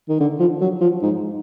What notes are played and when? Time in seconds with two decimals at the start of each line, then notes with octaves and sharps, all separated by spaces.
0.09 D#3
0.20 D3
0.40 F3
0.61 F#3
0.81 F3
1.02 G#2